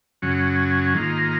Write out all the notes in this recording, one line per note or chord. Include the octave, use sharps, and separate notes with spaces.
F#2 C#3 F#3 C#4
G#2 D#3 A#3 F4